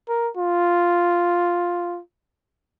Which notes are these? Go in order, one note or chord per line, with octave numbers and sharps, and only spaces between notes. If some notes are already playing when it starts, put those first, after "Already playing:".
A#4
F4